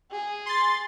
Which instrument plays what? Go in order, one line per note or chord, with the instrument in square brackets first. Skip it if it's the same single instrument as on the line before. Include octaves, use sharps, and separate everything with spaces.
[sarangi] G#4
[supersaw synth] C6 A6